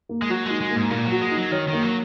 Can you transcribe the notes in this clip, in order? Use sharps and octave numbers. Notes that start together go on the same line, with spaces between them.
A#3
G#3
F#3 F#4
G#3 D#4
G#3
A#3
G#2
A#2 A#3
F#3
F#4
G#3
D#4
F#3
D#3 C#5
D#3
A#3
F#3